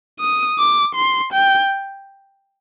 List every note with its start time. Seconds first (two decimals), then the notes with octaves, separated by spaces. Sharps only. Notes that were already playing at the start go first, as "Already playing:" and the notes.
0.20 D#6
0.58 D6
0.95 C6
1.33 G5